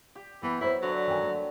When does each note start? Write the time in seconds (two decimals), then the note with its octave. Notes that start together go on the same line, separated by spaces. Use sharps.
0.15 G4
0.43 E3 B3
0.61 F#3 E4 B4 C5
0.83 D3 F#3
1.07 D#3 G#5
1.23 A3